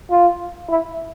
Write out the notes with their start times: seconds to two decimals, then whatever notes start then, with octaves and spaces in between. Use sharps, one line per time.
0.10 F4
0.69 E4